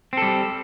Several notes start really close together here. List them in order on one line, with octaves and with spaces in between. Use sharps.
C4 A4 G3